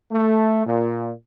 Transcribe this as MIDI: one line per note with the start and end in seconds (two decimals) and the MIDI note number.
0.12 0.66 57
0.66 1.11 46